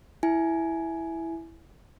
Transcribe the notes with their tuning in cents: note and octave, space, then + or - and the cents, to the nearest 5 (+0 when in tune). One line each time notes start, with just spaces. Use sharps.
E4 +0 G#5 +15